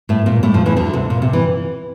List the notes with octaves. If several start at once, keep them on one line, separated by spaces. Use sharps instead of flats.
A2 A3
A#2 A#3
A2 A3
F2 F3
E2 E3
D2 D3
C3
A#2
C3
E3